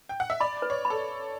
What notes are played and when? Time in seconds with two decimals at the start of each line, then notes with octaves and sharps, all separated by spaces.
0.09 G5
0.20 F#5
0.30 E5
0.40 D5 B5
0.62 B4
0.70 C#5
0.85 B5
0.90 A4